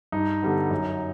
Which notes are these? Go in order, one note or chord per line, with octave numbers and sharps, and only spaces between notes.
G2 D#4
D3 G3 B3
F#2